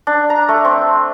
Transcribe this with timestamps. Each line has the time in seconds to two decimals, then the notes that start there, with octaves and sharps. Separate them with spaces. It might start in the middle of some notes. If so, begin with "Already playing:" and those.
0.07 D4
0.30 A#5
0.49 A3
0.65 C4